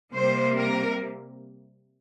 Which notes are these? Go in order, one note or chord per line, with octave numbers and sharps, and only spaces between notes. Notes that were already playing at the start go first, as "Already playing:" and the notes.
C3 G3 A#3 C5
A#4